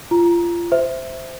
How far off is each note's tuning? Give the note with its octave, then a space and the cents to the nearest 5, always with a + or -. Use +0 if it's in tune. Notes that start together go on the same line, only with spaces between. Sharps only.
F4 -30 A#5 +10
C5 -10 E5 +0